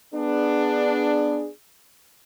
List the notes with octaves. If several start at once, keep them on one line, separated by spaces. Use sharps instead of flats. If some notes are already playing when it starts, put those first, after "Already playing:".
B3 D4 G#4